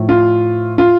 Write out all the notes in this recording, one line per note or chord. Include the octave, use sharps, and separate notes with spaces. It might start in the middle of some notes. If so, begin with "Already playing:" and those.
Already playing: A2 F3
F4
F4